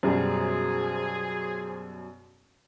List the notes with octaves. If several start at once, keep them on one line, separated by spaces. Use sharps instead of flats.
F#2 B2 G3 G#4 C5